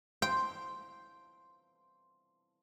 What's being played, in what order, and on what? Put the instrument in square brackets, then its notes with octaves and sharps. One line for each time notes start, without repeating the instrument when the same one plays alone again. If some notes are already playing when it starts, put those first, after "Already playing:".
[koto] G5 [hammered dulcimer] C6